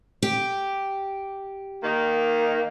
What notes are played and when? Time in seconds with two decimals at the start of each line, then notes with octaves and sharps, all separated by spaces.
0.22 G4
1.83 D#3 A#3